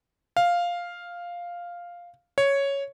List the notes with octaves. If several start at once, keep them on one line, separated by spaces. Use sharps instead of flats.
F5
C#5